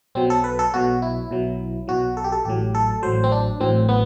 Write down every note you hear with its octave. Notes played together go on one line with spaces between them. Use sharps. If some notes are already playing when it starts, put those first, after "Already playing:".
B1 B2 F#3 C4
A4
B4
A4
B1 B2 F#3 F#4
E4
B1 B2 F#3
B1 B2 F#3 F#4
A4
G4
A4
A1 A2 F#3 G4
A4
A1 A2 F#3 C5
C4
D4
A1 A2 F#3 C4
B3